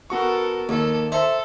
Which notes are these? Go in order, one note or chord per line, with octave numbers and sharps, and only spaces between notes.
B3 F#4 A4 A#4 C#6
D#2 A#3 A4
A4 C5 E5 A#5